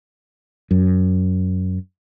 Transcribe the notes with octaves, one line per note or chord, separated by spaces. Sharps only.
F#2